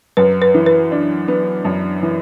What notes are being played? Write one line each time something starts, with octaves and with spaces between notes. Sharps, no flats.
F#2 B4
B4
E3
B4
D4
B3
F#2
E3